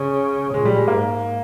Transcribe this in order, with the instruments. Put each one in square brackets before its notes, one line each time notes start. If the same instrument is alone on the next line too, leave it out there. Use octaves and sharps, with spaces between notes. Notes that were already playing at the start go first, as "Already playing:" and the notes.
Already playing: [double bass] C#3
[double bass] A#2 [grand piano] G#3
[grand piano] G3
G#3
[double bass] G#2 [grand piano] A#3